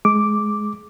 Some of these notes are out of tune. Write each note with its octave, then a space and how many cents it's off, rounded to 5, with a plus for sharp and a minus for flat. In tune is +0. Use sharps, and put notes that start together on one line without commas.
G#3 +15 D6 +0